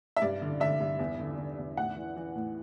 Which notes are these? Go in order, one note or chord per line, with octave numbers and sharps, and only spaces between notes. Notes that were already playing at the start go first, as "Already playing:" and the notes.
E5
G2 D5
D3
D3 E5
G2
E2
D3
D3
E2
A2 F#5
E3
E3
A2